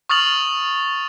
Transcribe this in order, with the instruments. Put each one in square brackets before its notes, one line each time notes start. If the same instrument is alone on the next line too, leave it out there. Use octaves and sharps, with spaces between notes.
[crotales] C#6 D#6 F6 A6 F7 F#7